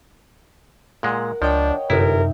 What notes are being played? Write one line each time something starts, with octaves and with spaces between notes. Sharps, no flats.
A#2 G#3 A#4 F#5
C#2 F3 D4 C#5 D#5 G5
G1 F#2 C3 D#4 E4 A#4 E5